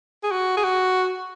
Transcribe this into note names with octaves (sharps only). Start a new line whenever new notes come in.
G#4
F#4
G#4
F#4